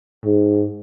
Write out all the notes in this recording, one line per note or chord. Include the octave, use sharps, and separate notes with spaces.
G#2